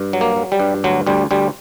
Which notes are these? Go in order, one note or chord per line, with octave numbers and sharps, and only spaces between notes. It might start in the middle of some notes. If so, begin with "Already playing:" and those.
Already playing: G2
F#3
A#3
F#3
G3
G2
D2 F#3
D2 G3
D2 G3